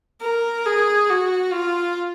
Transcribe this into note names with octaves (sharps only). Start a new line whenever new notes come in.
A#4
G#4
F#4
F4